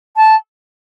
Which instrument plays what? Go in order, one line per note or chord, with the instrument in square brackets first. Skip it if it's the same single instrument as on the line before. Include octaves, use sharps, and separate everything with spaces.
[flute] A5